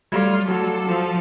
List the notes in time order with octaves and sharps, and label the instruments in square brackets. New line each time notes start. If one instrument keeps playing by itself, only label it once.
[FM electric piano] F#3 G3 A3 [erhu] F4 [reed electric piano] D5 G#6
[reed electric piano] F#3 F#4 [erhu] A4 [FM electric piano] D6
[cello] F3